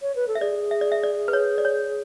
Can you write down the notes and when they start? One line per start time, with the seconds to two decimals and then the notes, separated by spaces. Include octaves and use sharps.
0.02 C#5
0.16 B4
0.28 A4
0.35 E5
0.40 G#4 D5
0.71 E5
0.81 D5
0.92 E5
1.03 D5
1.28 B4
1.33 C#5
1.58 D5
1.65 C#5